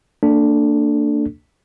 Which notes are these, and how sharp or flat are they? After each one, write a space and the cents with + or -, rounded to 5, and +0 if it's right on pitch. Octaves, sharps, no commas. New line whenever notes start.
A#3 -40 D4 +0 A4 +0